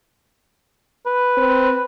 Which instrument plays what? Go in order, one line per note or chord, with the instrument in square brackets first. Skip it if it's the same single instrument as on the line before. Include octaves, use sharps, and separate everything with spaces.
[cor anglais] B4
[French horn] C4